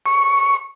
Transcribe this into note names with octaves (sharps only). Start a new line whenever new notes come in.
C#6